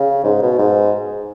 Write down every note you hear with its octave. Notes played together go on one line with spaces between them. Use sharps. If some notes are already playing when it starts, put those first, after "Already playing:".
Already playing: C#3
G#2
B2
G#2